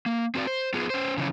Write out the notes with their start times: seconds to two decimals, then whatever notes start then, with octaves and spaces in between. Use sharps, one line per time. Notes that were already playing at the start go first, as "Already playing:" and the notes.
0.06 A#3
0.35 C4 F#4 C5 D5
0.47 C5
0.74 B3 F4 G#4
0.90 C#4 C5
1.17 C#3 E3 F3 C#4